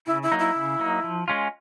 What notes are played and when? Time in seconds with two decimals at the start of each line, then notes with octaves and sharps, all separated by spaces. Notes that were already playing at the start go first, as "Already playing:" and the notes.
0.07 C#3 E4
0.23 E4
0.32 F#3 A#3 D#4
0.39 E4
0.55 C#3
0.79 F#3 A#3 D#4
1.04 F3
1.28 G#3 C#4 F4